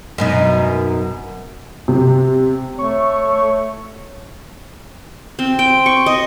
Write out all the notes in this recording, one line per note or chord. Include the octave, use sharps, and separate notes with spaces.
F#2 B2 D#4
C3
A3 C#5 C#6
C4
G5
C#6
D#5